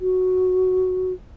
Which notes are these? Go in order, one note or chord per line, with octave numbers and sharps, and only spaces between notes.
F#4